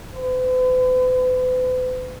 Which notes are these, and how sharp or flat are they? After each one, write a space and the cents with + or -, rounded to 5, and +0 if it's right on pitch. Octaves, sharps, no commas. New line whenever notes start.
B4 +45